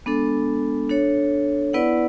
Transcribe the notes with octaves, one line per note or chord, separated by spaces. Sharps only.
G#3 B3 D4 A4
D4 A4 C#5
B3 E4 B4 D5 F#5